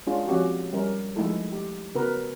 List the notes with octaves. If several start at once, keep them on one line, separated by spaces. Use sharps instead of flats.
G#3 C#4 D4 F4 G#4
F3 C4 C#4 F#4 G4
G3 C#4 A#4
F3 G#3 A3 D#4 E4 A4
G4
C#3 B3 F#4 A#4 B4